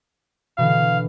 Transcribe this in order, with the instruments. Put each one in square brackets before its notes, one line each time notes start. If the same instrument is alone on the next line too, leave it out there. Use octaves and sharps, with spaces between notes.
[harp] B2 D3 E3 [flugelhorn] F5